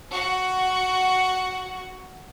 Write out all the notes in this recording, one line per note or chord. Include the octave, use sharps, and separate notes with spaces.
F#4 F#5